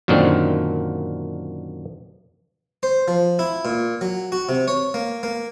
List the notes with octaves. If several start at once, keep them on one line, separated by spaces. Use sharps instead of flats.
F#2 A#2 D3 D#3 C4 D4
C5
F3
E4
A#2
F#3
F#4
C3
C#5
A#3
A#3